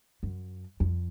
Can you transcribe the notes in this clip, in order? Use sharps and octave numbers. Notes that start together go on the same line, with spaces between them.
F#2
F2